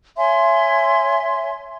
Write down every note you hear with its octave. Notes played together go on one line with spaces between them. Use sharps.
C#5 E5 G#5 C6